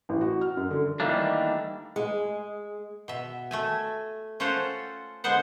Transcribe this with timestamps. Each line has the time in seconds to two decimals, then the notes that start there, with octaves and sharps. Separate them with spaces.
0.09 A1
0.21 F#4
0.41 F6
0.57 F#2
0.71 D3
1.00 D#3 E3 G3 A3 A#3 D4
1.96 G#3
3.08 B2 E5
3.51 A3 E5 G#5
4.40 C#4 F4 A4 C5 F#5
5.24 D3 G#3 B3 C5 F#5